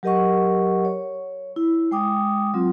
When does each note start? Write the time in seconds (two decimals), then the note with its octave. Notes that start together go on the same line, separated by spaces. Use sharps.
0.03 F#3 G4 A#4 D#5 F#5 C#6
0.85 C#5
1.56 E4
1.91 G#3 G5 D6 D#6
2.54 F#3 C4 F4